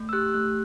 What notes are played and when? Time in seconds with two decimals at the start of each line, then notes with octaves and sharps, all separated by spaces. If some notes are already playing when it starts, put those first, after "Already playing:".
Already playing: A3
0.09 E6
0.13 G4 F#6
0.34 A3 F#6